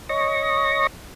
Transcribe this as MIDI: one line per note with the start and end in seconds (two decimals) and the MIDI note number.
0.09 0.87 73
0.09 0.87 75
0.09 0.87 85
0.09 0.87 94